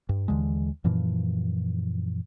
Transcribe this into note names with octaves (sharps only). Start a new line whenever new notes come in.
G2
D#2 D3 E3 G#3
F#2 A#2 E3 F3